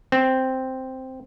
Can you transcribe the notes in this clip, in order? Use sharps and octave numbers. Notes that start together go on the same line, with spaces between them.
C4